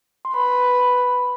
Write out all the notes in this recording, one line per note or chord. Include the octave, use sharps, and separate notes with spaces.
C6
B4 B5
B5